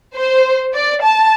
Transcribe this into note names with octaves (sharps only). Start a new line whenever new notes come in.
C5
D5
A5